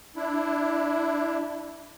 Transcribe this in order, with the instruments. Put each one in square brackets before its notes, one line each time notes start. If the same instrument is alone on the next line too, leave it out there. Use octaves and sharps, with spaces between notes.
[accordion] D4 E4